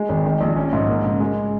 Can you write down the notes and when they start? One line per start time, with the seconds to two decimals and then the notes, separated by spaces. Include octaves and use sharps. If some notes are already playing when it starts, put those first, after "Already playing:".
Already playing: G#3
0.09 G#1
0.25 D#3
0.41 A#1
0.56 C#4
0.73 G#2
0.88 A#3
1.04 C#3
1.20 G#3